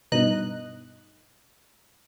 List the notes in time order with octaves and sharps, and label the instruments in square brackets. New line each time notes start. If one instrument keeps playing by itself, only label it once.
[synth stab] G2 B2 D#4 D#5 F#6